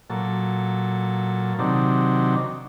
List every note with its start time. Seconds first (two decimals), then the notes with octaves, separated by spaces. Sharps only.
0.10 A#2 F#3 A4
1.59 C3 D#3 F#3 D4